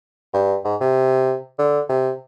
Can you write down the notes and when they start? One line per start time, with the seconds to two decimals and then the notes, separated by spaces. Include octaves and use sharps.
0.34 G2
0.65 G#2
0.81 C3
1.59 D3
1.89 C3